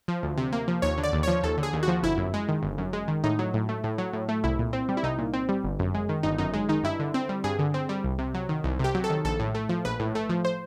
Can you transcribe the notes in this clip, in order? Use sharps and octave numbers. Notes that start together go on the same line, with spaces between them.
F3
D2
C3
A#3
F3
D#2 C#5
D3
D5
D#2
F3 C#5
D#2 A4
D3
G#4
D#2
F#4
F3
G1 E4
F#2
G#3
D#3
G1
F#2
G#3
D#3
A2 D#4
F#3
A2
A3
A2
F#3
A2
A3
C2 E4
A#2
C4
G3
E4
C2 D#4
A#2
C4
G3
G1
F#2
G#3
D#3
G1 D#4
F#2 D#4
G#3
D#3 D#4
G2 E4
D3
C4
G3
G2 G#4
D3
C4
G3
C2
C3
F#3
D#3
C2
C3 G4
F#3
A4
D#3
A#1 A4
A2
A3
F3
A#1 B4
A2
A3
F3
C5